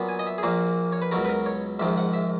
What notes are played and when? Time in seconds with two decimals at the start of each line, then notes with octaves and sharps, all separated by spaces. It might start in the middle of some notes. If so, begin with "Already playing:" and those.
Already playing: A#2 F#3 B3
0.09 G#5
0.19 D#5
0.27 E5
0.38 G#4
0.43 A#1 A#2 A#3 F#4
0.93 C#5
1.02 B4
1.12 C#2 B2 F#3 A#4
1.25 B4
1.29 A#4
1.46 C#5
1.79 A#1 G#2 D#3 E5
1.98 F#5
2.14 E5